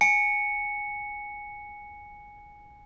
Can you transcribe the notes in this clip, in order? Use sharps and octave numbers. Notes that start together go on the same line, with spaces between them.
G#5 C#7